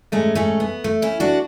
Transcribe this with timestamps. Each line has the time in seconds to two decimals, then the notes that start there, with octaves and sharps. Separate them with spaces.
0.12 G#2 G#3 A3 C#4
0.35 A3 C#4
0.60 B3
0.84 A3
1.02 C#4 E4
1.20 D4 F#4